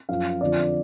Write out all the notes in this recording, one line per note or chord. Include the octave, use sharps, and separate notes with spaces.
F#2 F3 F5
F2 D3 F3 D5